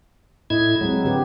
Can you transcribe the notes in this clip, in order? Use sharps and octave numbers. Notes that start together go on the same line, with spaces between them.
A2 E4 D#5 G#6
F#3 G#3 C4
D3 G4 B4